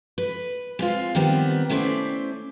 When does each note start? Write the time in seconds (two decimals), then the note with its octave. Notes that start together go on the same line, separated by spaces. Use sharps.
0.18 B4
0.79 G#3 C4 F4
1.15 D#3 G3 B3 C4
1.70 A3 C#4 E4 C5 D5